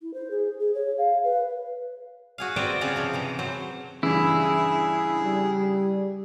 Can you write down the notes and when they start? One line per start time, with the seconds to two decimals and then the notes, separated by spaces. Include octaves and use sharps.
0.01 E4
0.14 C5
0.30 G#4
0.60 G#4
0.74 C#5
0.98 F5
1.24 B4
2.38 F#4 G#4 F5
2.56 C4 B4 C5 D5 E5 A#5
2.81 C#3 C4 F4 G#4 C#5 D5
2.96 C3 F3
3.14 C3 E3 A#5
3.39 F#3 C4 C5
4.03 G2 C#3 E3 E4 G#4
5.23 G3